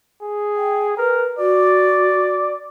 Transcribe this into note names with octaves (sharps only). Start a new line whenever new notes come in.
G#4
G5
A#4 B4
F#4 D5